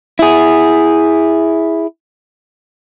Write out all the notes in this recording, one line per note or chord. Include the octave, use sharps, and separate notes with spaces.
E4 G#4